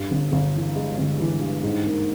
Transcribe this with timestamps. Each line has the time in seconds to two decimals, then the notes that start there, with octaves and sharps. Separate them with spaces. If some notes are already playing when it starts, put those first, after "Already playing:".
Already playing: G2
0.11 G1
0.32 G1
0.55 E3
0.76 G#3
0.98 G1
1.20 E3
1.41 G2
1.63 G#2
1.86 A#3